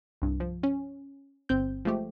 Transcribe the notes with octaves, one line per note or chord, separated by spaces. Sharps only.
C2 G2
F3
C#4
G1 C4 G6
F3 G#3 A3 G4